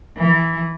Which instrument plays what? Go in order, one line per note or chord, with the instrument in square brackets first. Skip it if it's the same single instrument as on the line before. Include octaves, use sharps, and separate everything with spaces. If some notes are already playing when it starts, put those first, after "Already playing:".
[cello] E3